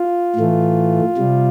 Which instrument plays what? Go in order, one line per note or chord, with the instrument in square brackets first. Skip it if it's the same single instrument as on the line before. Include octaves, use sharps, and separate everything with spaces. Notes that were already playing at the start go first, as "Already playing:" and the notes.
Already playing: [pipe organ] F4
A2 E3 A3
C3 G3